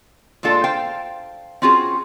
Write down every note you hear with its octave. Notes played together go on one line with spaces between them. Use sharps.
A#2 G#3 D4 F4 A4
C5 F5 G5
C4 C#4 F4 F#4 G#4